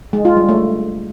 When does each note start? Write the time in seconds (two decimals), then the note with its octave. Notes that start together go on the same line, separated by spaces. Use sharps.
0.13 G#3
0.25 F4
0.37 G3
0.49 A3